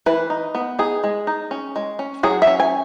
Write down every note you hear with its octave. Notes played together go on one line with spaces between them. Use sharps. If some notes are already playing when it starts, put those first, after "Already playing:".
E3 B4
D#4
B3
D#4 G#4
G#3
D#4
C#4
G#3
C#4
F#3 G#4
E5
C#4
G#5